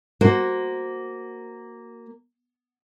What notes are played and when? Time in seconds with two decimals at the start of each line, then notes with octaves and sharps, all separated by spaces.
0.21 A#3 F#4 C5